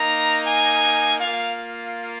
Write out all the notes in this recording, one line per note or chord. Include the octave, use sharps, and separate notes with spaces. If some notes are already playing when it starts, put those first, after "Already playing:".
Already playing: A#3 D#4 A#5
G#5
A#3 F4 F5